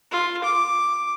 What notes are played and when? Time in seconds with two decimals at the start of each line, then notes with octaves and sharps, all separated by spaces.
0.11 F4
0.44 D6